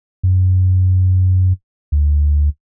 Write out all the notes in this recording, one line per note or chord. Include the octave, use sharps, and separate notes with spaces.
F#2
D2